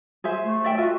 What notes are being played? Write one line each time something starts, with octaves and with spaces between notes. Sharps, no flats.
G#4 C5 E5
A3
D5 E5 G5
F4 F#4 A4 D#5